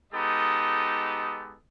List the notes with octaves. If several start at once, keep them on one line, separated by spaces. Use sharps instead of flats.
G#3 B3 D#4 G4 A4 D#5